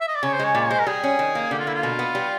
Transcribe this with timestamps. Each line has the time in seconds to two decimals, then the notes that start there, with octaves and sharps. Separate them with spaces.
0.01 E5
0.08 D#5
0.15 D5
0.23 C#3 C#5
0.34 C5
0.39 G#3 C#5
0.55 A#2 D5
0.63 C#5
0.70 G#3 C5
0.79 A#4
0.87 G3 G#4
1.03 C#4
1.19 D#3
1.35 A#3
1.51 D3 G4
1.59 F4
1.67 A#3 E4
1.75 F4
1.83 B2
1.99 B3
2.15 G3